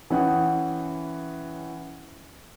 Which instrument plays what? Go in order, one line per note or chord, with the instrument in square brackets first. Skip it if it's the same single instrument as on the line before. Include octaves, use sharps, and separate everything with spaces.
[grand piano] E3 C#4 F#5 G5 D#6